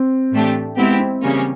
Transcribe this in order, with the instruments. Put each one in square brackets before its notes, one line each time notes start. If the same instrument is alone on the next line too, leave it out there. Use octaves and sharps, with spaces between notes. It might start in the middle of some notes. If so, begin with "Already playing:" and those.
Already playing: [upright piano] C4
[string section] A2 E3 A3 D4 G4
[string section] G#3 C4 E4 G4 [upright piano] B3
[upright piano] C4
[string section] C#3 E3 G3 A#3 C#4